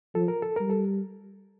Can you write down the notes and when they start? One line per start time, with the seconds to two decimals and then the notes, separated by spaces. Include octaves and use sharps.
0.15 F3 A4
0.28 A#4
0.42 A4
0.56 G3 A#4
0.70 A4